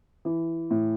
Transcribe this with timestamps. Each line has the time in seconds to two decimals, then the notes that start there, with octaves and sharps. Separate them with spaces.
0.25 E3
0.71 A2